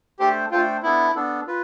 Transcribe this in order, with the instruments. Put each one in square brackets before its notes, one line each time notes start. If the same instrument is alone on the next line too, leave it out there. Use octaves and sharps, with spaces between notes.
[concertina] A3 D4 A4 C5 G5 [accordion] G4
[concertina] A3 D4 A4 C5 G5 [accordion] F4
[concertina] B3 D4 A4 [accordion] E4
[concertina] B3 D4 A4
F4 B4